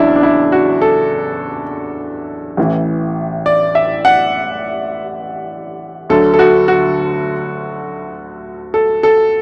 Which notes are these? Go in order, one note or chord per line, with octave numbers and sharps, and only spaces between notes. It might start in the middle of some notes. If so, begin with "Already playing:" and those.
Already playing: F#1 E2 F#3 D4 E4
D4
E4
F#4
A4
A1 A2 E3
D5
E5
F#5
D2 D3 F#3 A4
A4
F#4
F#4
A4
A4